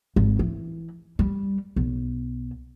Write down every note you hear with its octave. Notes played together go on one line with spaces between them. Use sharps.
G#1
E3
G3
B1